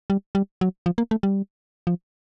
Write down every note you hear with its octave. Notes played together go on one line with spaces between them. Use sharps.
G3
G3
F#3
F3
A#3
A3
G3
F3